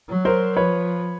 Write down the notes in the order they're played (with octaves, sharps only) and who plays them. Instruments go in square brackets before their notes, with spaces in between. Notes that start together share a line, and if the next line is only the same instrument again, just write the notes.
[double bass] F#3
[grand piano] A#4 C5
[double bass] F3 [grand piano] B4 C#5